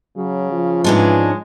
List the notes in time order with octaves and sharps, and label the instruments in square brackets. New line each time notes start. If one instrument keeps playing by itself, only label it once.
[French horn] C#3 [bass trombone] F#3
[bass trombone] F3
[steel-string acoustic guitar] G#2 C#4 D4 [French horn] E3 [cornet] G#3